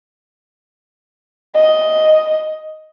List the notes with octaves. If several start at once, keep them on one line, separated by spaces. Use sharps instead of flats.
D#5